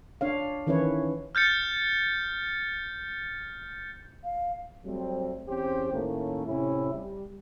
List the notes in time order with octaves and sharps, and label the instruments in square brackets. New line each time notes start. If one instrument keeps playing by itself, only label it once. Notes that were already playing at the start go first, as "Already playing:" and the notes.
[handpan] D4 C#5 F5
D#3 E3 C#4 E4 B4 C#5
[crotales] F6 G6 A6 C#7
[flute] F5
[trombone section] F#3 G3 A3 C4
E2 C4 C#4 G4 C5
A2 D#3 A3 A#3 C#4
A2 C3 C#4 E4
G3